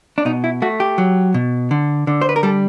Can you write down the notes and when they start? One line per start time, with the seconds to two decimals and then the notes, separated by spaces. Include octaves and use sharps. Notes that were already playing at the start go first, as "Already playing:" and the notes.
0.18 D4
0.25 B2 D#4
0.44 E4
0.62 A3 F#4
0.80 G4
0.98 F#3
1.34 B2
1.71 D3
2.07 D3
2.22 C5
2.29 B4
2.36 A#4
2.43 G3 A4